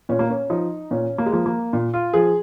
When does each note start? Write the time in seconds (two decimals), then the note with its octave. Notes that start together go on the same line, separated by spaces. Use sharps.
0.09 A#2 C#4
0.19 A#3
0.30 C#4
0.50 F3 D#4
0.91 A#2 C#4
1.18 A#3
1.26 G#3
1.32 F3 A#3
1.46 A#3
1.73 A#2
1.94 F4
2.13 F3 G#4